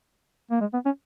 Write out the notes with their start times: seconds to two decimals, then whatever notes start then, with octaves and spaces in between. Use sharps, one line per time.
0.51 A#3
0.61 G#3
0.73 B3
0.85 C#4